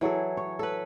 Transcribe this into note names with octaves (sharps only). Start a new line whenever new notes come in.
E3 F#3 G#4 A4
C#5
A4 B4